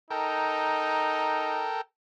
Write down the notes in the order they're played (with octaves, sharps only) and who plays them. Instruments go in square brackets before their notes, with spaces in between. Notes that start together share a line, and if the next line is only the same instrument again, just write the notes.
[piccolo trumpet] D#4 [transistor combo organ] A4 A#4 G5